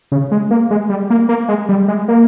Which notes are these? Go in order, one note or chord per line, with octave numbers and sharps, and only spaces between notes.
C#3
G#3
A#3
G#3
G3
A#3
A#3
G#3
G3
G#3
A#3